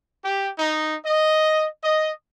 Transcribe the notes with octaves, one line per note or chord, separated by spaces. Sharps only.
G4
D#4
D#5
D#5